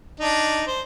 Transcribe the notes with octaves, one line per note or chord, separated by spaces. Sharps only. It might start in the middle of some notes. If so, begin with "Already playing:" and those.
D4 D#4
C5